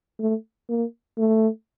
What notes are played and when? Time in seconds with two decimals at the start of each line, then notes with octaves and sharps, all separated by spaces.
0.19 A3
0.69 A#3
1.18 A3